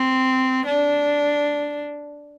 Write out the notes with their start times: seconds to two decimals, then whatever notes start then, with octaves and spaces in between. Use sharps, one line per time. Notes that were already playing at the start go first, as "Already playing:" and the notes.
Already playing: C4
0.66 D4